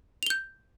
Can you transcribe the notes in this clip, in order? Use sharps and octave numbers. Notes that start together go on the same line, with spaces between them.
G6 F7 G7